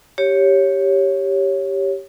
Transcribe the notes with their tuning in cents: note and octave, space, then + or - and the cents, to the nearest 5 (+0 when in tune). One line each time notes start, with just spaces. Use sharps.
G4 +0 C#5 +0